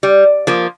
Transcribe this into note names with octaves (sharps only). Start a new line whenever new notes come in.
G3
F3 A#3